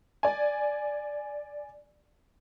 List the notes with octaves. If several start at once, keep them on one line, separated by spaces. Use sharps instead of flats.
D5 G#5